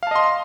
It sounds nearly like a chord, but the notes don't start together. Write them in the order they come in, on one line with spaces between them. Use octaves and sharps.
F5 A5 D#5 C6